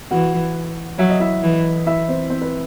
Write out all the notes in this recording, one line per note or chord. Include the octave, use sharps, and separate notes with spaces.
E3 F#4 F#5
F#3 E5
D#5
E4 E5
E3
E4 E5
C4 C5
C4 C5
B4